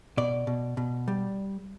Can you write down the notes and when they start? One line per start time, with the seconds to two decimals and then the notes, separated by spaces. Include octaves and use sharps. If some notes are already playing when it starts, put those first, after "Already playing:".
0.17 B2 D5
0.47 B2
0.77 B2
1.08 G3